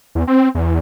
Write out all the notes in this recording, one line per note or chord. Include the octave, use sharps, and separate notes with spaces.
E2
C4
E2